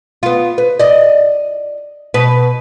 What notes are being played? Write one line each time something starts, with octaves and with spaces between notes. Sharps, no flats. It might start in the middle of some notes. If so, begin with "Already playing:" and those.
B3 F4
B4
D5 D#5
B2 B4